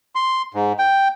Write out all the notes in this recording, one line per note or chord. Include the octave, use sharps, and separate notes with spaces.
C6
G#2
G5